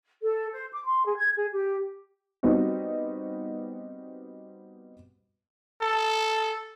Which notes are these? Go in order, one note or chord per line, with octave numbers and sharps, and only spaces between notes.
A4
C5
D6
C6
G#4
G#6
G#4
G4
G3 B3 C4 D#4 F#4
A4